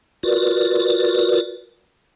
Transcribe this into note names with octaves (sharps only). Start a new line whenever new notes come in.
F4 F#4 A#4 B4 D5